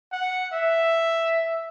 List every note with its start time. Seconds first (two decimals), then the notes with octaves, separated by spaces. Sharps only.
0.12 F#5
0.53 E5